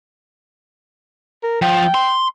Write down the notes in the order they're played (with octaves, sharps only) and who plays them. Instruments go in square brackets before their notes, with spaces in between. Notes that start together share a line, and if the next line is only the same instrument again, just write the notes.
[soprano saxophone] A#4
[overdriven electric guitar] F3 [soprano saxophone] G5
[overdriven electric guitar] C6